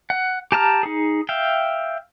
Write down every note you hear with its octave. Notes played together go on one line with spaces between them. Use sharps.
F#5
G4 A5 A#5 F6
D#4 G#4
E5 F5 G5